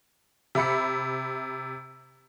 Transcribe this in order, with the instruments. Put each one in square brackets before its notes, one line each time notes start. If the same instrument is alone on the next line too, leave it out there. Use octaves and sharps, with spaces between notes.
[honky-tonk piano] C3 E5 B5 C#7